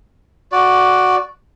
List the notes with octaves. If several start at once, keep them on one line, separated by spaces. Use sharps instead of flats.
F#4 D5